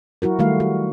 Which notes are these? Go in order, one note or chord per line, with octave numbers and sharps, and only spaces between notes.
F#3 E4 F#4 A#4
D#3 G3 A3 F#4 F5
F#4